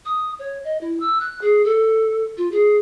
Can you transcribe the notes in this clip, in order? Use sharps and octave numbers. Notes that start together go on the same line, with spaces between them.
D#6
C#5
D#5
E4
E6
F#6
G#4
A4
F4
G#4